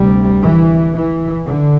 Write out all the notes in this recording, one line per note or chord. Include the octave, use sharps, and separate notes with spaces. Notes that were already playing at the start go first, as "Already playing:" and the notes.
Already playing: D2 C3 G3
E3
E3
D3